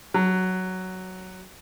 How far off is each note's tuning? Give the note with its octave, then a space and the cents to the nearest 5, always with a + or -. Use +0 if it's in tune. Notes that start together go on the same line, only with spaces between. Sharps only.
F#3 +5